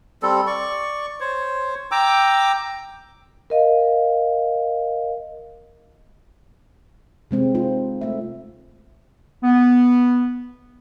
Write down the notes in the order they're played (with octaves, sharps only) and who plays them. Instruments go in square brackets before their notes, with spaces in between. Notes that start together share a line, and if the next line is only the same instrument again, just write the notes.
[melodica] G3 C4 A4
D5 C#6
C5 C#5
G5 A#5 D6 E6
[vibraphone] A#4 D#5 F5
[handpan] C3 G#3 C4
D#4 F4 C5
A3 E5
[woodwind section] B3